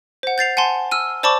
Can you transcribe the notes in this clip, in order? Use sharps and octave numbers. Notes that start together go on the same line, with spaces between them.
C5 F#5
G6 A6 C7 F7
F#5 G#5 A5 C6
E6 F6 D#7
C5 D5 A5 B5 C#6 D6